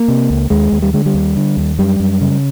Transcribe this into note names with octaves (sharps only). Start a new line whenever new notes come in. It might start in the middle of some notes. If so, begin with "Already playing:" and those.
Already playing: A#3
C3
C#2
D#2 G#3
D#2
G3
D3 G#3
G3
D#2
D3
D#2
F#2 G3
F#2
C#3